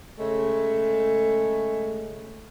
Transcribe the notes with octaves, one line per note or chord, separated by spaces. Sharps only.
C#3 G#3 A3